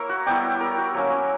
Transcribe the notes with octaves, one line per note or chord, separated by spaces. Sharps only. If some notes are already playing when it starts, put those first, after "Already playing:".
Already playing: A#3 E4 A#4 C#5
F#4
G3 B3 E4 G4
A#4
F#4
F#3 A#3 C#4